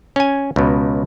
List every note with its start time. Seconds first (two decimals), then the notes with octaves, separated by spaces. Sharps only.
0.16 C#4 G#5
0.56 C#2 B2